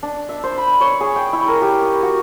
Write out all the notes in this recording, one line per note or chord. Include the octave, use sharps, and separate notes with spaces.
D4
E5
C5
B5
C#5
G#4
G5
E4
A#4
G4
D#6
F#4